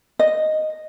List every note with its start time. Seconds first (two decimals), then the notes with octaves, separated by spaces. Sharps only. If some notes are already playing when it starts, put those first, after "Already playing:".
0.19 D#5